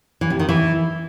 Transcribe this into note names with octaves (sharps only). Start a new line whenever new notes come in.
E3
C3
D#3
E3